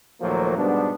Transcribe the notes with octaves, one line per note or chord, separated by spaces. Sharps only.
D#2 A#2 F3 F#3 A3 A#3
G#2 B2 G3 B3 D4